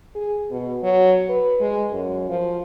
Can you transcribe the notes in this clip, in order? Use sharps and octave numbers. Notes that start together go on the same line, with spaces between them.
G#4
B2
F#3
B4
G#3
F#2
F3